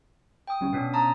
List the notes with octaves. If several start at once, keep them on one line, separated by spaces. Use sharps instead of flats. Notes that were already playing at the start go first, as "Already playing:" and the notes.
G5 D#6
D2 G3 C#4
B2 B3 C#4 D4
A5 A#5 D#6